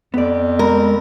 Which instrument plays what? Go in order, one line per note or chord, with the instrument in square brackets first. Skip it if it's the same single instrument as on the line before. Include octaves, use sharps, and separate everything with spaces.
[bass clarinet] F2 [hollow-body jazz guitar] B3 D5
[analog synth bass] G#3 [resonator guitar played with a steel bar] A#4